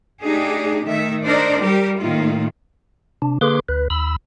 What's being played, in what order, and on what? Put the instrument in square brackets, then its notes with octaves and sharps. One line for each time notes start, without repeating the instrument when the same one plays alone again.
[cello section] A3 D4 D#4 G4 G#4
D#3 A3 E5
D4 D#4 A#4 C5 D5
G3 G4 A#4
A2 D#3 A3 A#3 F4
[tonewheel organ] C3 D4
D3 A#3 G#4 B4 C6 D6
D2 B4
D#2 B5 E6